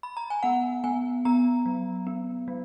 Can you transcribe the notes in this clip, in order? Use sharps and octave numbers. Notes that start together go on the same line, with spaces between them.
B5
A#5
G#5
B3 F#5
B3 G#5
B3 A#5
F#3
B3
F#3